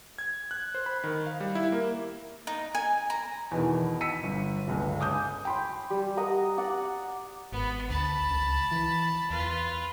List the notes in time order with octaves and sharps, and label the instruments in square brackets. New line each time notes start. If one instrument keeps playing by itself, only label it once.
[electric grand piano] G#6
F#6
C5
B5
D#3
F5
G3
E4
A#3
[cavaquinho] D#4
G#5
A#5
[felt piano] E2 B2 D#3
E6 B6 C#7 D#7
G1
G1 C#2 G2
G#5 D6 D#6 G6
G5 B5 C6
[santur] G3
D#5 F#5 A#5
D5 F#5
[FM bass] G#1 [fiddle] B3
[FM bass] D2 [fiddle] A5 B5
[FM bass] C#2
E3
[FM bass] E2 [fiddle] F4 B4